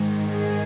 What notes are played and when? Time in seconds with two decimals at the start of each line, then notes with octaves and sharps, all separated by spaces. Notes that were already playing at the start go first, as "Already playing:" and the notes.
Already playing: G#2 D#3 G#3
0.33 G#4